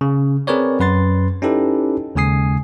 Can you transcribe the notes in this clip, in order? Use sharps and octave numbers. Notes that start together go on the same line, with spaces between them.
C#3
C4 G#4 A#4 B4 C#5 D5
F#2 B4 C6 A6
C#4 D#4 E4 G4 A4 B4
D#2 C#3 G#3 G#5 D#6 C7